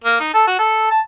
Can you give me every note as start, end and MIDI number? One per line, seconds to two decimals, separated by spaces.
0.04 0.18 58
0.20 0.29 63
0.34 0.45 69
0.47 0.57 66
0.59 0.90 69
0.91 1.00 81